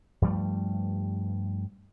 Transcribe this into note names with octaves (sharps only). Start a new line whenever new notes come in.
G2 F3 G3 A3